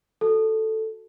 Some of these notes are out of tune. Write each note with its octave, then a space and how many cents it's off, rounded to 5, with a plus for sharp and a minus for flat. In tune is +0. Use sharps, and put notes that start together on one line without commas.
F#4 +0 A4 +0